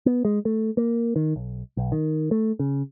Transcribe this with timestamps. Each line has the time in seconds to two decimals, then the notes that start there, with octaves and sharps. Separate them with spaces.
0.06 B3
0.25 G#3
0.45 A3
0.77 A#3
1.16 D#3
1.36 B1
1.77 B1
1.92 D#3
2.31 A3
2.59 C#3